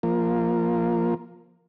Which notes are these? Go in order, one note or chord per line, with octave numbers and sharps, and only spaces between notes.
F3 A#3